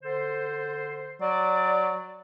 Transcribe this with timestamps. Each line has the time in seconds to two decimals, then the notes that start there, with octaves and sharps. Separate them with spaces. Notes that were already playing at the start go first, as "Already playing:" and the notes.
0.03 D3 A4 C5
1.21 F#3 D5